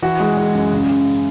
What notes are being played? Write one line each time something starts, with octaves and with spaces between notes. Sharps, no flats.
E3 F#4
G#3
G#3
F#2
C#3
C#3